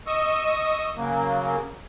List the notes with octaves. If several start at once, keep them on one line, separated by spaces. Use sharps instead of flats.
D#5 C#6 D#6 E6
C#3 F#3 A#3